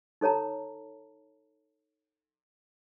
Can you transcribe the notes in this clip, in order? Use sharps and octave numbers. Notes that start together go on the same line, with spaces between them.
D#4 A4 C#5 A5 A#5